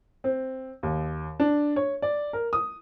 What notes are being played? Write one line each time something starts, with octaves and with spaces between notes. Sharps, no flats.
C4
D#2
D4
C#5
D5
A#4
D#6